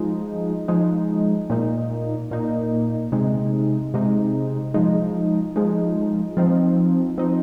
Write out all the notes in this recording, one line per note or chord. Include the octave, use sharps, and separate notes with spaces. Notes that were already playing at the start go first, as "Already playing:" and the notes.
Already playing: F3 G#3 D#4
F3 G#3 D#4
A#2 A#3 D#4
A#2 A#3 D#4
C3 G#3 D#4
C3 G#3 D#4
F3 G#3 D#4
F3 G#3 D#4
F3 C4 D#4
F3 C4 D#4